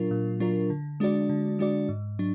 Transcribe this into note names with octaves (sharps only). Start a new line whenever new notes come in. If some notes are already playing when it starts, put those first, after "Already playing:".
Already playing: A#2 F#3 D4 F4 A#4
A#2
F#3 D4 F4 A#4
D3
G#3 D4 F#4 D5
D3
G#3 D4 F#4 D5
G#2
F#3 D4